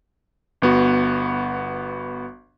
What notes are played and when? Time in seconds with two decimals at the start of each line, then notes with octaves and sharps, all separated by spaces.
0.62 G1 B3 F#4